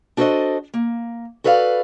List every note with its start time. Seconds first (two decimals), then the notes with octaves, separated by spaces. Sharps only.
0.17 D4 F#4 A4 B4 C5 D#5
0.74 A#3
1.44 F#4 A4 B4 D5 F5